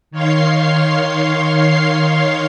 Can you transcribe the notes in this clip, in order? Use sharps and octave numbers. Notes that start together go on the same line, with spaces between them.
D#3 C#5 F5 C6 C7